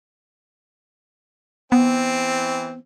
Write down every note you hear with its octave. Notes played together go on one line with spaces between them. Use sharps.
E3 B3 C4